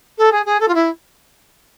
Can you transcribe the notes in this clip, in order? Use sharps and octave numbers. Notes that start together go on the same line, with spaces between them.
A4
G#4
G#4
A4
F4
E4